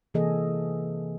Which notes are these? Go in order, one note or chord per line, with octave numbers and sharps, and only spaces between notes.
C3 E3 A#3 G#4 A4 D#5